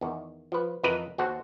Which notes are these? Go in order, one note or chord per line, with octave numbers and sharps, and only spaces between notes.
E2 D#3
F3 B4
F2 E3 A#4 B4 D#5
D#2 F#4 A4 C5 F#5